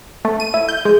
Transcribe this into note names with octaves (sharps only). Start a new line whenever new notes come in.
A3
D#7
E4
G6
G#3